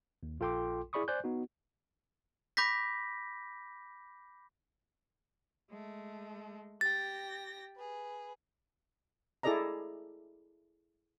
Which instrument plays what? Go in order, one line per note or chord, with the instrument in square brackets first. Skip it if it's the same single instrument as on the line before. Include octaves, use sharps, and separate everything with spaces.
[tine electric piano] D#2
A#1 F4 A4 G5 C6 D6
E4 G#4 D5 B5 C#6 D#6
C5 D5 G#5 F#6 G6
B3 D#4 F#4
[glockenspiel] B5 D6 G6 A#6 B6
[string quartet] G#3 A3
[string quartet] G4 G5 A#6 [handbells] A6
[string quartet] G#4 B4
[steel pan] E4 G#4 A4 D5 D#5 A#5